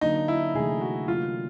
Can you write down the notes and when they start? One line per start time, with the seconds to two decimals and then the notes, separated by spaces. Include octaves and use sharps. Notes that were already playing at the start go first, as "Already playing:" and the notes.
0.01 D3 F#3 A#3 D4 D#4
0.28 E4
0.55 C3 E3 A3 G#4
0.81 F#4
1.08 F#3 A#3 D#4 F4 G4